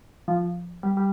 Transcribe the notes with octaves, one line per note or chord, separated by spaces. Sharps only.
F3
G3
G3